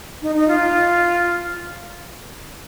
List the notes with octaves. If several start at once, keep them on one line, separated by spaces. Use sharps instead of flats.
D#4
D#4
F4